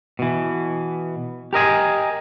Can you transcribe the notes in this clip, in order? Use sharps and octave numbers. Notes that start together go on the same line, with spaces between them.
B2 E3
G4 A#4 D#5 G#5